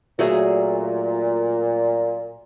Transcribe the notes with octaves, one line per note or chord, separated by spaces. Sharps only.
A#2 F#3 A3 G#4